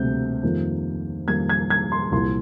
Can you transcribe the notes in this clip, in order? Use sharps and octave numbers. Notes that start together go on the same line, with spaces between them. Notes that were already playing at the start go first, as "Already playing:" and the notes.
Already playing: D2 C3 G3 A#3 G6
F2 D#3 G3 A#3
F2 D#3 G3 A#3 G#6
G#6
G#6
C6
C2 A#2 F3 C6